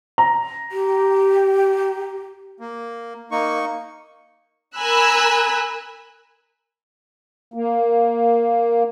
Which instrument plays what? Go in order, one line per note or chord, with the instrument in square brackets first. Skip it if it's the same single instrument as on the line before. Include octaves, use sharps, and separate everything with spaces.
[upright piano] A#5
[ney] G4
[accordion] A#3
[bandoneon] A#3 [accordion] D#4 C#6
[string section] A#4 G#5 A#5 B5 E6 F#6
[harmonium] A#3